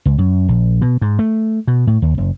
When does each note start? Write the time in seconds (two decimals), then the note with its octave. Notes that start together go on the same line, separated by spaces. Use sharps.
0.05 C#2
0.18 F#2
0.48 A#1
0.82 B2
1.01 G#2
1.19 A3
1.67 B2
1.87 A2
2.02 D#2
2.18 F#1